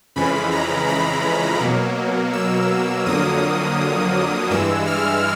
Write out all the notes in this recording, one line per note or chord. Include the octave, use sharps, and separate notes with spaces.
F2 C#3 E3 G#3 B5
A#5
B5
B2 F#3 A#3
E6
F2 D3 F#3 A#3 D#6
G2 E3 G#3 E6
F6